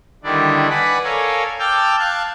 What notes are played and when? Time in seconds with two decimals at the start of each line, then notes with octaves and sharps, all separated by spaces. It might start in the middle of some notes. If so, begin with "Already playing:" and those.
0.24 D3 D#3 G3 D4 E4 D5
0.70 B4 D5 F#5 G#5 B5
1.04 A4 A#4 C#5 F5 G#5
1.59 G5 A5 D6 E6 F6 G6
1.99 F5 A5 F#6 G#6